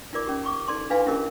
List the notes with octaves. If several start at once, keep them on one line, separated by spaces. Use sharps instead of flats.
D#4 F4 A#4 D5 D6
C#4 G4
B5 C#6 D6
D#4 A4 D5 A5 C6 D6
D4 E4 B4 F5 G#5 B5
C#4 E4 G4 G#4 A#4 D#5